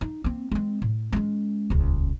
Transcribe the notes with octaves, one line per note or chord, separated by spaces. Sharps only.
D#4
A#3 C4
G#3 C4
A2
G#3 C#4
D#1 C#2